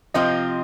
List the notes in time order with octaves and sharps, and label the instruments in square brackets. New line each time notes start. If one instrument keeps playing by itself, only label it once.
[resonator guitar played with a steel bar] C3 F3 C4 F4 [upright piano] D#5